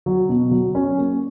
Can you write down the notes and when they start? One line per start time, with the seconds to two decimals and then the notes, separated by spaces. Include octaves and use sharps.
0.06 F#3
0.29 B2
0.51 F#3
0.75 C#4
0.98 A#3